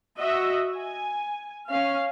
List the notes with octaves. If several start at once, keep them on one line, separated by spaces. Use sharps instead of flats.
F#4 D#5 E5
G#5
C#4 F5